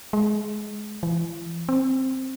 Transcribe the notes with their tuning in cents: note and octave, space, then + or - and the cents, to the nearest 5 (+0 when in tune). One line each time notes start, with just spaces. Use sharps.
G#3 +20
E3 +35
C4 +5